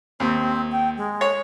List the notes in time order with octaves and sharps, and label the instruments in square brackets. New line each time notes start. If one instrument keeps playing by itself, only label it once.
[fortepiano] D#2 [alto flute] C4
[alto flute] G5
G#3
[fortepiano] C#5